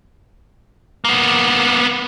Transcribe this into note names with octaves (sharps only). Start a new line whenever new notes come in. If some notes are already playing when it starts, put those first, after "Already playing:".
A#3 B3